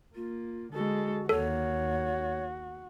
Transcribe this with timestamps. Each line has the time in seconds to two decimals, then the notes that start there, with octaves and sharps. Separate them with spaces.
0.15 A#3 F4
0.74 D3 G#3 F#4 A4
1.29 D#2 A#3 F#4 A4 C#5